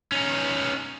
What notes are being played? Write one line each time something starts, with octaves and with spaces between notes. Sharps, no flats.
C#4 D#4